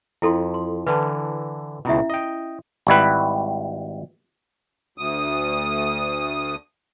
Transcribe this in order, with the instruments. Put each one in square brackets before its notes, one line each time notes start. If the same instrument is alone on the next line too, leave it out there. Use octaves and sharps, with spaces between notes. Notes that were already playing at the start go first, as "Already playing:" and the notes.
[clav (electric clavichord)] F2 [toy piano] E4 A4 C6
[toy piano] C6
[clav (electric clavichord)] D3 E3 [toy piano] B4 A5
[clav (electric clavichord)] C#2 B2 [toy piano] C#4 E4 E5
[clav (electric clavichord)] D#5 G5
G#1 G3 E4 B4
[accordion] D2 D#6